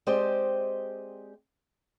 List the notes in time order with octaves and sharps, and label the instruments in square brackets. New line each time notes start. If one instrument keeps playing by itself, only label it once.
[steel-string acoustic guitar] G#3 C4 G4 C5 D5 D#5